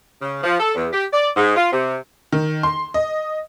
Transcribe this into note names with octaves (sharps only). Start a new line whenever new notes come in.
C#3
F3
A4
E2
G4
D5
G#2
F4
C3
D#3
C6
D#5